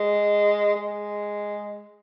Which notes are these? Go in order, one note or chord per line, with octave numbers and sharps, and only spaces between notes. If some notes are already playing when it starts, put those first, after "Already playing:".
Already playing: G#3
G#3